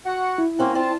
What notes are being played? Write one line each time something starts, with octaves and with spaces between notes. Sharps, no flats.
F#4 F#5
E4
F#3 A#3 C4 C#4
C4 D4 F4 A5